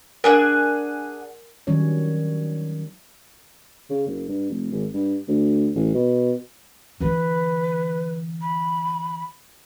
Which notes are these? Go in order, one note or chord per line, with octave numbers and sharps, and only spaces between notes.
D4 G#4 A#4 F#5 G#5
D#3 F#3 G3 C#4 C#5
C#3
F#1
G2
F1
G#1
G2
D2
A1
B2
D3 E3 B4
B5